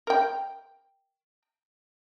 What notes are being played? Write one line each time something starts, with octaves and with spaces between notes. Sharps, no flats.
A#4 G5